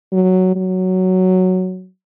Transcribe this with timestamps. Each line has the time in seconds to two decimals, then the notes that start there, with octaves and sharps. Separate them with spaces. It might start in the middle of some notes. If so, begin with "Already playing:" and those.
0.12 F#3
0.56 F#3